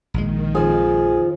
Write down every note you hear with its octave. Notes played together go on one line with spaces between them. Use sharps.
A#1 D#3 G#3
F2 F3 G#4